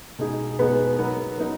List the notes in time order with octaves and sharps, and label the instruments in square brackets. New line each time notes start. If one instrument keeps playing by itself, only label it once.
[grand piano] B2 G#3 D#4 G#4
[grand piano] B2 G#3 D#4 G#4 [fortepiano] B3
[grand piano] F#3 B3 D#4 A#4
F#3 B3 D#4 A#4